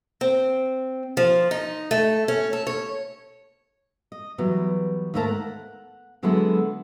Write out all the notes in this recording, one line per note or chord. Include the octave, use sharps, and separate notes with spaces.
C4
F3
D#4
A3
C#4
A4
C#5
D#5
E3 F#3 G3 B3
D#2 G#2 A3 A#3 A#4 A5
F#5
D3 F#3 G#3 B3 E4 A4